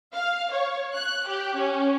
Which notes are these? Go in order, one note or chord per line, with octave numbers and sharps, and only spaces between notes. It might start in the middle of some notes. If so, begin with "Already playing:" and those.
F5
C#5
F#6
G4
C#4